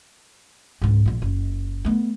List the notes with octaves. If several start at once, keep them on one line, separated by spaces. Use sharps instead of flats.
C#2 G#2
A#1 A#2
F#1
A3 B3